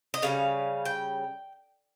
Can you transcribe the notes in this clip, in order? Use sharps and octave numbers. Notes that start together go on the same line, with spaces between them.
D#5
C#3 G3 C#4 F5
G5